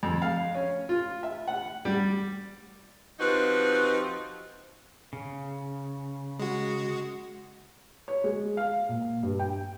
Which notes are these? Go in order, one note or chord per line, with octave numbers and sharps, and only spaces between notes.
F2
F5
C#4
F4
E5
F#5
G3
F3 C4 D#4 F#4 G4 B4
C#3
G#3 F#4
C#5
G#3
F5
A#2
G2
G5